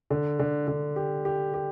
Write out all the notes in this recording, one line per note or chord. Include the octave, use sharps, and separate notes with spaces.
D3
D3
D3
G4
G4
G4